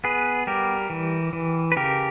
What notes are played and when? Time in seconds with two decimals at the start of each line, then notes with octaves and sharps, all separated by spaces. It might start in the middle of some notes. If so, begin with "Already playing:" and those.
0.04 B3 G#4 B4
0.47 G3 G4 A#4
0.90 E3
1.33 E3
1.72 B4
1.76 C#3 G4 A#4